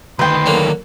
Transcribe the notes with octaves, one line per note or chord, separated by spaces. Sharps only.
D2 D#3 B4 G5 C6
D3 F#3 A#3